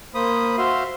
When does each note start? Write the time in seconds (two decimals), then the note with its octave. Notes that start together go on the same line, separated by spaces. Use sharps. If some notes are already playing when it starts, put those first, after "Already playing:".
0.14 A#3 C5 B5 D#6
0.58 F#4 C5 E5 F5 C6